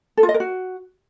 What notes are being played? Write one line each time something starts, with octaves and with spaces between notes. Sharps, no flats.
A4
F4
D#5
A#4
F#4